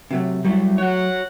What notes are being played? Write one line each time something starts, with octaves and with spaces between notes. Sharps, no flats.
C3 F#3 A3
F#3 G3 A3 E4
F#4 C#5 F#5